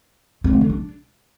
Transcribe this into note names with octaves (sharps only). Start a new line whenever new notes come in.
C4
A3
D3
D4